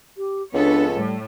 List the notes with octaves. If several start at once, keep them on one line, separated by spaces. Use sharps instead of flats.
G4
C#2 B3 D4 A4 C#5
A2 G3